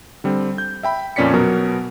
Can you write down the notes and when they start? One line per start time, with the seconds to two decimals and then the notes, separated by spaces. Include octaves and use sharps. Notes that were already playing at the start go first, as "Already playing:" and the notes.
0.24 D3 G3 C4
0.58 G6
0.83 E5 G5 B5
1.16 F2 A#2 C#4 D5 B6 C#7
1.34 B2 F#3 B3 A#4